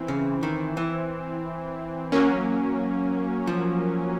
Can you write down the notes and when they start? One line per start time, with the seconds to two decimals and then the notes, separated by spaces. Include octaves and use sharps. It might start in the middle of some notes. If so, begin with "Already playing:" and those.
Already playing: E3 C4
0.08 C#3
0.43 D#3
0.77 E3
2.12 F#3 A#3 C#4
3.47 F3